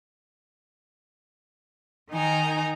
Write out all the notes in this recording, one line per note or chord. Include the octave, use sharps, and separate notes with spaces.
D#3 D#4 G#5 A#5